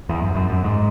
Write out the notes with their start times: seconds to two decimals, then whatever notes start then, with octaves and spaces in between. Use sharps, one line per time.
0.09 E2
0.22 F#2
0.35 F#2
0.50 F#2
0.64 G#2